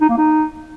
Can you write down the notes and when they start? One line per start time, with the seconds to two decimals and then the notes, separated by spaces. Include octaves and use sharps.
0.01 D#4
0.09 A#3
0.18 D#4